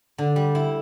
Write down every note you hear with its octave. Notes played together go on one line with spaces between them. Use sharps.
D3
G3
E4